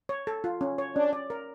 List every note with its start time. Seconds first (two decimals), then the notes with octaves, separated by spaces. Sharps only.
0.09 C#5
0.27 A4
0.44 F4
0.61 C#4
0.78 C#5
0.96 C#4 D4
1.13 D5
1.30 A#4